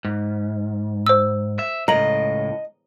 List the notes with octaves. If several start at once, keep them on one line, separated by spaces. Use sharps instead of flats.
G#2
C5 E6
E5
C#2 A2 D#5 A#5 F#7